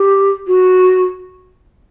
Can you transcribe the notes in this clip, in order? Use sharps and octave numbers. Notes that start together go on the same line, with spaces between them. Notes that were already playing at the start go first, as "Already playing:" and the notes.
Already playing: G4
F#4